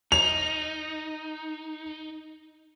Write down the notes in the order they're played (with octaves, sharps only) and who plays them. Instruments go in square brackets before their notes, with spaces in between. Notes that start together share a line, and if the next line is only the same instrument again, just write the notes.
[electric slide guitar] D#4 [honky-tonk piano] F7